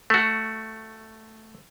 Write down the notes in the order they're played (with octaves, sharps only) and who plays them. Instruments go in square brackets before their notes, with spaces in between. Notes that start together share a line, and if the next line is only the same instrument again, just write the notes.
[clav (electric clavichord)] A3 F#4